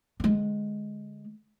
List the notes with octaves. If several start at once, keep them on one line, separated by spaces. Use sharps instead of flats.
D3 G#3